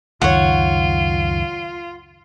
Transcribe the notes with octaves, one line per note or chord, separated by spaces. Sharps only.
C#2 F#2 D#3 F4 C#5 F#5